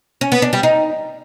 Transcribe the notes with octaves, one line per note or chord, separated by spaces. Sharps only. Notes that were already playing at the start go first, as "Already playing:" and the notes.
C#4
B3
D4
G3
D#4